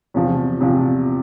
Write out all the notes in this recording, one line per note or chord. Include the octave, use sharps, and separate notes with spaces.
E2 C3 F3
E2 C3 F3